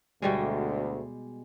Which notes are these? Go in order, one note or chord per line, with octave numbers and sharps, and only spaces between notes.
D2 B2 G3 G#3